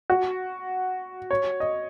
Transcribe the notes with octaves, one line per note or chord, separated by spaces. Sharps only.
F#4
C#5
D#5